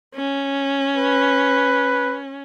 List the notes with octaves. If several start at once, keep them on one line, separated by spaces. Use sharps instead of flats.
C#4
B4